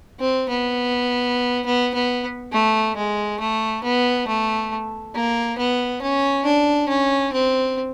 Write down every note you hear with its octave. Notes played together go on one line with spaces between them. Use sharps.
C4
B3
B3
B3
A3
G#3
A3
B3
A3
A#3
B3
C#4
D4
C#4
C4